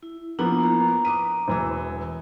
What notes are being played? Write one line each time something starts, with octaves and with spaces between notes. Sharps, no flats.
E4
F3 A#3 B3 D4 E4 A#5
A#5
D6 D#6 D#7
E1 E3 E6